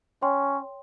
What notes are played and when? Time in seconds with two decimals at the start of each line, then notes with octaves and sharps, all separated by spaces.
0.22 C#4 C#5 G5 C6